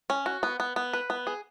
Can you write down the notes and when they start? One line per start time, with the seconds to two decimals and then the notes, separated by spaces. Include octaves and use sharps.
0.10 C#4
0.26 F#4
0.43 B3
0.60 B3
0.76 B3
0.93 B4
1.10 B3
1.27 G#4